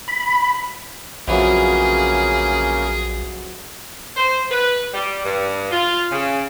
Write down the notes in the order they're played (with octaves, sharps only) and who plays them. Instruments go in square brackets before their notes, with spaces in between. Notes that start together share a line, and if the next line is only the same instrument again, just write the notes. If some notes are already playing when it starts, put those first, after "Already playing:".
[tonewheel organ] B5
[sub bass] A#1 [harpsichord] F2 E3 F#3 [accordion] C#3 A#3 C#4 [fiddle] G#4
[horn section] C5
B4
G3
G2
F4
C#3